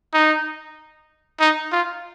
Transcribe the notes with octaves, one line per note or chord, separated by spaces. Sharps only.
D#4
D#4
F4